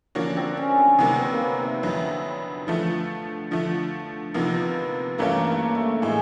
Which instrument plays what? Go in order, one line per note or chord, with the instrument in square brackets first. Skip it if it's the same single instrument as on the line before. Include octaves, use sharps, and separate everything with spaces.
[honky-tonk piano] D3 F3 A#3 C#4 F#4 [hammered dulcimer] D4
[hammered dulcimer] C4
C#4
C4
[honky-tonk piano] C3 D#3 F#3 A#3 [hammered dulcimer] B3
[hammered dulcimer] C4
A#3
B3
E4
[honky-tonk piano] F2 D3 F#3 [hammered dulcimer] E4
[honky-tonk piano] D3 F3 A3
D3 F3 A3
[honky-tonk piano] C3 F3 A#3 D#4 [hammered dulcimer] B3
[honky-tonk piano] G2 E3 A3 C#4 [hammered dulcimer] A#3
[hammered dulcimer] A#3
A3
[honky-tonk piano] A2 E3 [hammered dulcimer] G#3